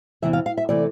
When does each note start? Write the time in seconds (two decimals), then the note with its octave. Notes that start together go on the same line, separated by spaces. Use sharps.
0.22 E2 C3 E3 B3 E5
0.33 F5
0.46 F5
0.58 E5
0.69 C3 E3 A3 D5